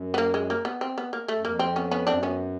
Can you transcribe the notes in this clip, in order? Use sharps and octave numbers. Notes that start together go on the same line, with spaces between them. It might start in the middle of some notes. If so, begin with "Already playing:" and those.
Already playing: F#2
B3
A#3
G#3
A#3
B3
C4
B3
A#3
A3
F#2
F2 A#3
C4
B3 C#4
B3 C#4
F#2 C4 D4
B3 C#4